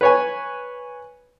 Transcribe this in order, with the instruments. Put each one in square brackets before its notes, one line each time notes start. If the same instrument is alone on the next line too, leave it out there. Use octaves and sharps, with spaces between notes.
[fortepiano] B4 C#5 G#5